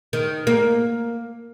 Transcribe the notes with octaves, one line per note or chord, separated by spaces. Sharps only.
D#3
A#3